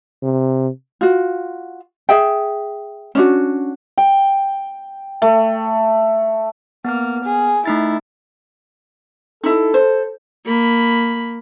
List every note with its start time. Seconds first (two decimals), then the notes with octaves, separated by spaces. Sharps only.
0.23 C3
1.01 F4 F#4
2.09 G#4 E5 G5
3.15 C#4 D4 F#4
3.98 G5
5.22 A3
6.85 A#3 B3 F6
7.24 G#4
7.66 A3 D#4 E4 A6
9.44 D#4 E4 A4
9.74 C5
10.46 A#3 B5